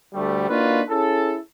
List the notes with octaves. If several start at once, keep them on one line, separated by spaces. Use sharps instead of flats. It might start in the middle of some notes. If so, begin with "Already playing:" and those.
D2 G3 A3
A#3 D4 D#4 F4 F#4 B4
C#4 E4 G#4 A4